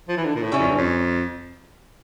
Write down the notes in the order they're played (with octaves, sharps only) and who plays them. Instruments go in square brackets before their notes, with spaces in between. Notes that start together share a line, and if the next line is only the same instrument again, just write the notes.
[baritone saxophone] F3
E3
D3
A#2
A2
[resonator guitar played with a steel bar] C#3 G3 C#4 E4
[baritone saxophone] F2
G2
F2